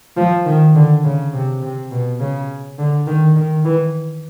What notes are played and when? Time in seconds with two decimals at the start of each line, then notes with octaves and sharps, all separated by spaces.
0.17 F3
0.46 D#3
0.75 D3
1.04 C#3
1.33 C3
1.62 C3
1.92 B2
2.20 C#3
2.79 D3
3.07 D#3
3.36 D#3
3.65 E3